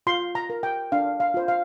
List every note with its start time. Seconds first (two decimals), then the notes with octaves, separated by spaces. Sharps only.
0.07 F4 C6
0.35 A#5
0.50 A#4
0.63 G5
0.92 D4 F5
1.20 F5
1.34 F4 C5
1.48 F5